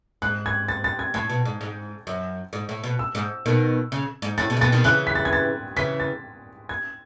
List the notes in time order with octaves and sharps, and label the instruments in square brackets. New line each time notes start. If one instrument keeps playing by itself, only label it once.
[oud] G#2 [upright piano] F#6
[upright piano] G#6
A6
A6
G#6
[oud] A2 [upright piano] G#6
[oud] B2
G#2
G#2
F#2
G#2
A2
B2
[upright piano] E6
[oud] G#2
B2 D#3
C#3
G#2
[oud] A2 [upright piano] A6
[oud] B2
C#3
[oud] B2 [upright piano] A6
[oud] B2 D#3
[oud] C#3 E3 [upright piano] F#6
[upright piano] B6
A6
G#6
A6
[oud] C#3 E3 [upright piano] B6
[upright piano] A6
G#6